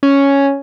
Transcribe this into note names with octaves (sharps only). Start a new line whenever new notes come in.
C#4